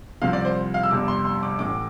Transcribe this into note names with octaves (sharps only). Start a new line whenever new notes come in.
C2 C3 F3 F5
D5
C5
F5
E6
G1 F2 C3 G3 D6
C6
C6
D6
A1 A2 E3 D6